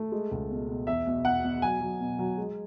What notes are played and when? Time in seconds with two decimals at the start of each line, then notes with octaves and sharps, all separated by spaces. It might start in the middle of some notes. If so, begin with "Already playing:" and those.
Already playing: A3
0.12 G#3
0.31 C#2
0.50 B2
0.68 B2
0.87 E2 E5
1.07 B2
1.24 E2 F#5
1.44 B2
1.62 F#3 G#5
1.81 F#3
2.01 B2
2.19 F#3
2.38 G#3